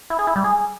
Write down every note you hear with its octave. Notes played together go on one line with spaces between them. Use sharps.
E4
G#4
E4
G3
G#4